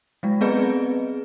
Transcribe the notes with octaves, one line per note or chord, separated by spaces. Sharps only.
F#3 G#3
B3 C4 G#4 B4 D5 D#5